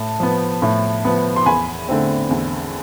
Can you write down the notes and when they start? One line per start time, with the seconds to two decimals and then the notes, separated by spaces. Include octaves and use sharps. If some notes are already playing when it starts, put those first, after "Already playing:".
Already playing: A2 A5
0.20 F3 B3
0.62 A2
1.05 F3 B3
1.36 C6
1.46 E2 G#5 B5
1.89 D3 A3 C4
2.31 E2